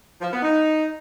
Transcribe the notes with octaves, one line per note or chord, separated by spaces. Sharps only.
F3
B3
D#4